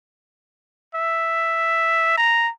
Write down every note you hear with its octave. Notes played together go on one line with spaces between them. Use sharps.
E5
A#5